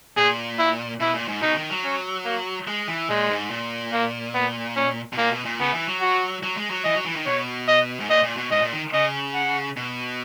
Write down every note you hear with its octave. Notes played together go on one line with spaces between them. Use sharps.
A#2 G#4
E4
B2 E4
A#2
G#2
B2 D#4
C#3
D#3
F#3
C#4
A#3
G#3
E3
A#2 G#3
G#2
A#2
A#3
B3
C#4
B2
A#2 A#3
B2
A#2
C#3 B3
E3
F#3
F#4
F#3
G#3
F#3
E3 D#5
F#3
E3
D#3
B2 C#5
D#5
G#2
A#2 D#5
A#2
B2
G#2 D#5
A#2
D#3
C#3 D#5
F#5
B2